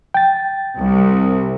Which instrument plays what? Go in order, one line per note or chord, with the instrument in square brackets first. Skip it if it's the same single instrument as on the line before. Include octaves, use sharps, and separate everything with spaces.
[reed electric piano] G5 A6
[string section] C2